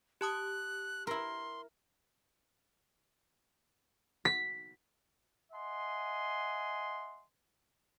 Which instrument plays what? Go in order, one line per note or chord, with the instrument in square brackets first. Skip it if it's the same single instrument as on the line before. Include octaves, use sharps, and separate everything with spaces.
[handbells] G4 A5 D#6 [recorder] F#6
[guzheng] E4 A#4 [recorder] C6
[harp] B6
[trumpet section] D#5 E5 F#5 G#5 C6